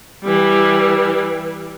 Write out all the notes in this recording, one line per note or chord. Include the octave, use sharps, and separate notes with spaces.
E3 G3